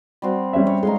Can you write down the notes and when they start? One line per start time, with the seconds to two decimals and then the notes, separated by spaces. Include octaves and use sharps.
0.22 G3 C4 F#4
0.53 G3 C#4 E5
0.67 C#5
0.83 G#3 D#4 F5 C6